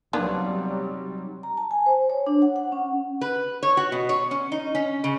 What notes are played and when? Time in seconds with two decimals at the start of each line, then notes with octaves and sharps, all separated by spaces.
0.13 C3 F#3 G3 A#3 B3 D4 D#4 C6
1.43 A#5
1.57 A5
1.71 G#5
1.86 C5
2.10 C#5
2.27 D4
2.42 F#5
2.56 F#5
2.72 C#4
3.21 B4
3.63 C#5
3.77 F#4
3.92 B2
4.09 C#5
4.31 C#4
4.52 D#4
4.75 C#4
5.04 C#3